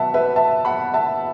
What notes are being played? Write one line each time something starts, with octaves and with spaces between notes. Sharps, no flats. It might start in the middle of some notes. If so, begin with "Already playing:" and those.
Already playing: B2 F#3 B3 E5 F#5 A5
B4 E5
E5 A5
F#5 B5
E5 A5